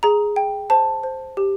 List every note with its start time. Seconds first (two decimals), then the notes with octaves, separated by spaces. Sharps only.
0.03 G#4 A#5
0.36 G5
0.70 C5 A5
1.03 C5
1.37 G4